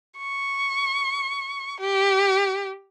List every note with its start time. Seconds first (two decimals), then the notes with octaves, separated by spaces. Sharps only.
0.18 C#6
1.80 G4